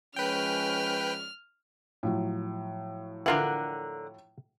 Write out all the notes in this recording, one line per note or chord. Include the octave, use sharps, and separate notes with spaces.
F3 G#3 C#4 B4 G5 F6
A2 F3 F#3
D3 E3 F4 A#4 F#5